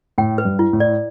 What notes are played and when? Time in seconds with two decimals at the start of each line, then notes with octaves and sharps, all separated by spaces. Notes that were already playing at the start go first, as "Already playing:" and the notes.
0.18 A2 G5
0.38 B4
0.45 G2
0.59 E4
0.73 A2
0.80 D5